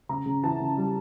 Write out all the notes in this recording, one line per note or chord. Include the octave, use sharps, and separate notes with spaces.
C#3 A#5
C#3
E3 A5
C#3
G3